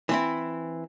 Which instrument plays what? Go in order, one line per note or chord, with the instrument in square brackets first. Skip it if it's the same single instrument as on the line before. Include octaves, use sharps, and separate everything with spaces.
[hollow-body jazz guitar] E3 C4 E4